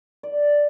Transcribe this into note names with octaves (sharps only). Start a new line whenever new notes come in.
D5